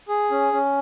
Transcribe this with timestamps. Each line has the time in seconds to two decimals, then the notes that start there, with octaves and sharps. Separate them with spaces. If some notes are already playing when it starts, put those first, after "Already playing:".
0.08 G#4
0.31 C#4
0.53 C#4